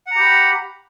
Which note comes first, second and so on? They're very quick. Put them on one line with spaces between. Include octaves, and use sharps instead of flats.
F#5 A#5 G4 B5